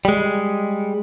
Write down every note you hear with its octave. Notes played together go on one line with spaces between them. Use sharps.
G3 G#3